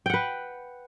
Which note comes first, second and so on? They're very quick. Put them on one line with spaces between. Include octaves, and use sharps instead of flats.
G5 F#5 B4